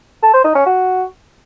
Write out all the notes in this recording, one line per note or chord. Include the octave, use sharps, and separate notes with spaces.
A4
C5
D#4
C#4
F#4